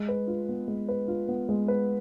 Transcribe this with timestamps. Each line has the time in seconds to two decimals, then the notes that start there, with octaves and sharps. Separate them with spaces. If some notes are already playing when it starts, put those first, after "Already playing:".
Already playing: G#3
0.08 B4
0.27 F4
0.49 B3
0.68 G#3
0.89 B4
1.08 F4
1.28 B3
1.49 G#3
1.68 B4